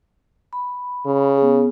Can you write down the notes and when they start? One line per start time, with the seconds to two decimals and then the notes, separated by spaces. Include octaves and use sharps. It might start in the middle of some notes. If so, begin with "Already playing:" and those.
0.53 B5
1.06 C#3
1.38 B3 G#4